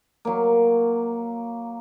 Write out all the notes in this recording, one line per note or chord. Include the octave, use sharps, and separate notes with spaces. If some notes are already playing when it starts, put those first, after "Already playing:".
F#3 A#3